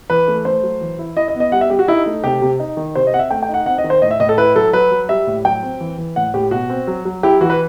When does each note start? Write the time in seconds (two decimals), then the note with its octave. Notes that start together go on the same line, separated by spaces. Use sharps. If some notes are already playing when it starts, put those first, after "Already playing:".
0.10 E3 B4
0.27 A3
0.45 A3 C5
0.63 F#3
0.81 E3
0.99 E4
1.17 E4 D#5
1.28 D#5
1.35 B3
1.40 D#5
1.52 G3 F#5
1.61 E5
1.70 G3 G4
1.79 F#4
1.88 D#4 E4
2.06 A3
2.24 C3 G4
2.42 C3
2.60 D#4
2.77 D#3
2.95 C3 C5
3.07 D#5
3.13 C4 F#5
3.19 E5
3.31 A3 G5
3.43 G5
3.49 D#4
3.54 F#5
3.66 C4 F#5
3.78 D#5
3.84 D#3
3.90 C5
4.02 A2 D#5
4.11 E5
4.20 A2 D#5
4.29 A4
4.38 E4 B4
4.56 F#3 A4
4.73 F#3 B4
4.91 F#3
5.09 G3 E5
5.27 A2
5.45 F#3 G5
5.63 C4
5.80 E3
5.98 E3
6.16 A2 F#5
6.34 A2 G4
6.51 B2 F#4
6.70 C4
6.87 F#3
7.05 F#3
7.23 E4 G4
7.41 E3 F#4
7.50 B4